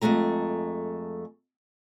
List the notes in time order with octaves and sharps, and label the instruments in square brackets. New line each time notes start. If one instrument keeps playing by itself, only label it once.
[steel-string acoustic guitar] F2 E3 G#3 A3 A#5